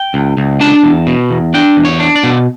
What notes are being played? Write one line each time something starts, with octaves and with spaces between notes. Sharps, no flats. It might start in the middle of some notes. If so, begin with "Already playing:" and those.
Already playing: G5
C#2
C#2
D4 A5
E2
B2
E2
D4 G5
E2
C#5
D4
D5
B2